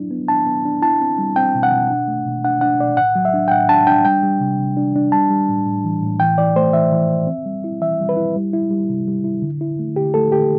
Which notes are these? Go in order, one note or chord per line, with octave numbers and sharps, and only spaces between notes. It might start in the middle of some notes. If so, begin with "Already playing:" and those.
Already playing: F#3 D4 E4
B3
D4 A5
B3
D4
E4 A5
C4
G3
C4 G5
B2
F#5
B2
D4
A3
B2
D4 F#5
D4 F#5
B2 D5
A2 F#5
F#3
E5
D4
G5
A2 F#5
D4 A5
D4 G5
G3 G5
G3
C3
C3
D4
D4
G3 A5
G3
A2
A2
E3
A2
E3 G5
E3 D5
A3 C5
E3 E5
E3
E3
C4
G3
E4
E3 E5
G3
B4
E4
G3
E4
G3
C3
G3
E4
D3
E4
A3
D3 G4
A3 A4
D3 G4